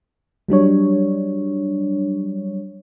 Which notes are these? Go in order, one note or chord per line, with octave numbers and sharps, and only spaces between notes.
F#3 G3 D4 C#5